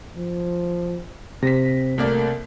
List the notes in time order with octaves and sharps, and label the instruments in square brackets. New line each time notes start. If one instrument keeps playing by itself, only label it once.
[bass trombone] F3
[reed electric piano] C3 [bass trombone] C4 [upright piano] A#6 B6
[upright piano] C2 A#3 D5 [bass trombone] A3